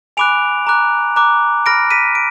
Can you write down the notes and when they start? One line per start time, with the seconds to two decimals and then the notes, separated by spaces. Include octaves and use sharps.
0.17 G#5 B5 D6 F#6 D7 F7
0.67 A#5 D6 F#6
1.16 A#5 D6 F#6
1.66 B5 F6 A#6 D7
1.91 B6 D#7
2.15 D7